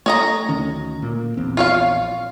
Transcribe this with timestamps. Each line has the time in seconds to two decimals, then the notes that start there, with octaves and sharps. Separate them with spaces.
0.06 A3 C#5 D#5 A#5
0.49 D2 D#3 C#4
1.02 A#2 A#3
1.37 A#1 E2 C4
1.57 F4 C#5 F5